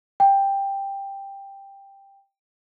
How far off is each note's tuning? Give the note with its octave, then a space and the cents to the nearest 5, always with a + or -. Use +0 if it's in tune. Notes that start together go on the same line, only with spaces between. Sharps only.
G5 +10